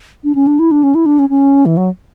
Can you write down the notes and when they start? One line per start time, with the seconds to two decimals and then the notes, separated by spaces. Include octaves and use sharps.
0.24 D4
0.35 C#4
0.47 D4
0.59 E4
0.71 D4
0.83 C#4
0.95 E4
1.06 D4
1.19 C#4
1.30 C#4
1.66 E3
1.77 F#3